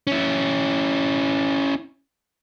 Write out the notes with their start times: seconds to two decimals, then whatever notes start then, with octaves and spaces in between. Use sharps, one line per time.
0.07 C#4 E4